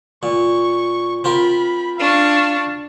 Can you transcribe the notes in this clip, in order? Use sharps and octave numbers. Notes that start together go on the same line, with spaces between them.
A#2 C#6
C4 F4 A#4 B5
D4 F5 C#6